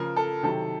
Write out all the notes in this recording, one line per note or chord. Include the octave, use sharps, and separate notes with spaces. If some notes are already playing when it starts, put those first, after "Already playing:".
Already playing: C#3 F3 A#4
A4
C3 D#3 F#3 A4